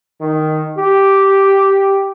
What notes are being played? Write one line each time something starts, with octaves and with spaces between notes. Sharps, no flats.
D#3
G4